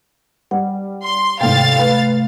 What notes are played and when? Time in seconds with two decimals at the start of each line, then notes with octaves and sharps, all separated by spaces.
0.51 G3 F#5
1.03 C6
1.41 G#1 A2 C3 F5 G5 A6
1.79 A3 B4